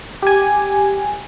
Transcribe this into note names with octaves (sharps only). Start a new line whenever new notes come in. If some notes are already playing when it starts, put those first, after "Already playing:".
G4 G#5